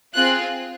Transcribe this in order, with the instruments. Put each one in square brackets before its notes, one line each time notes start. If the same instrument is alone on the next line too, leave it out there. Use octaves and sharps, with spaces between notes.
[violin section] C4 F4 G#4 F#6